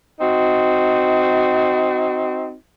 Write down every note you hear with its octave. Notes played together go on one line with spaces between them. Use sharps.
C4 D#4 F#4